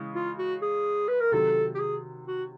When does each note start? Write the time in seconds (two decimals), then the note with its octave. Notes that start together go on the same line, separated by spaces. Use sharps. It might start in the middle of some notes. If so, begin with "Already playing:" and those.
Already playing: C#3 E3 G#3
0.15 F4
0.39 F#4
0.62 G#4
1.08 B4
1.20 A#4
1.32 C3 D#3 F#3 A4
1.75 G4
1.79 G#4
2.27 F#4